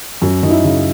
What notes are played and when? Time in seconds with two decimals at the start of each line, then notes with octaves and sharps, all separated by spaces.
0.22 F#2
0.43 F#2 D#4
0.50 E4
0.64 C#3